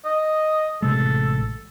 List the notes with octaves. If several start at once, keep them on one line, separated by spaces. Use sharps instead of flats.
D#5
A1 C3 G#3 A4